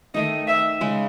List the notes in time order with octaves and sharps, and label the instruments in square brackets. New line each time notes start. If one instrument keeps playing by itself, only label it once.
[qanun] D#3 A3 D#4 [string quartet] D#5
[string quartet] E5
[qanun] C#3 G#3 C#4